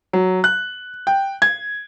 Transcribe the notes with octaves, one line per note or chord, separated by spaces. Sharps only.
F#3
F#6
G5
G#6